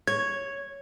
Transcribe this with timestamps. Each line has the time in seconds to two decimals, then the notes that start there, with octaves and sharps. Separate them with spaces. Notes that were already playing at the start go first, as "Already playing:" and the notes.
0.07 C#5 G#6